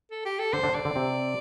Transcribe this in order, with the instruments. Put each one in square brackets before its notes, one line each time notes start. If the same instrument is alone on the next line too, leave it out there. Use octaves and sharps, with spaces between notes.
[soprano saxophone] A4
G4
A4
[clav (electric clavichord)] D3 D4 [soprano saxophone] C5
[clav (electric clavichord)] D3 D4
[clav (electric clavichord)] D3 D4 [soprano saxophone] D5
[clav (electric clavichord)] D3 D4
C3 C4